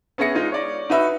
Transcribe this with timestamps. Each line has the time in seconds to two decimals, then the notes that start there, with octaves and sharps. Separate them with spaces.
0.18 B3 C#4 G#4 E5 A#6 C#7
0.35 G#3 D#4 F4
0.52 C#5 D5
0.90 D#4 F#4 B4 E5